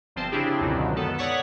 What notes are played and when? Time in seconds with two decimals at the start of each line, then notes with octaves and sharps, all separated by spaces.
0.16 G1 F3 C4 C5 A5
0.32 C#3 C4 D4 E4 G4 G#4
0.60 C#2 F#2 B2 D3 D#3 F#3
0.96 D#3 B3 A4
1.18 C#5 D5 F#5 C#6 D#6 B6